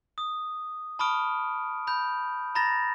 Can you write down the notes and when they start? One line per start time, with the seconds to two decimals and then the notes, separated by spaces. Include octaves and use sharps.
0.18 D#6
0.99 A5 B5 C#6 D#6 F6 D7
1.87 B5 G6
2.55 A#5 B5 A6 A#6